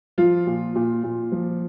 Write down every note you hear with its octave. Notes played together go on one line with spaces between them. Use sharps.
F3 F4
A#2
A#2
A#2
F3